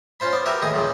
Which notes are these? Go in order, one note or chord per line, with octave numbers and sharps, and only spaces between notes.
C#4 F4 C5 B5
B3 D5
F#4 G4 A#4 B4 E5
D#2 A2 G#4 D#6
E2 A#2 C#3 G3